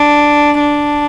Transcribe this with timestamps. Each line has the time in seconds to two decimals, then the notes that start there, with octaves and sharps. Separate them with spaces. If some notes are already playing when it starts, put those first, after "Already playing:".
Already playing: D4
0.60 D4